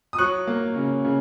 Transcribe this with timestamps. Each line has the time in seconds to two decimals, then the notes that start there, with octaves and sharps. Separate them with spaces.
0.13 D#6
0.18 F#3 C#6 F#6
0.47 A#3
0.76 C#3
1.05 C#3